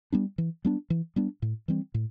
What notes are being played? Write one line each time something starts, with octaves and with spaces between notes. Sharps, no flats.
G3 B3 D4
E3
G3 B3 D4
E3
G3 B3 D4
A2
E3 G3 C4
A2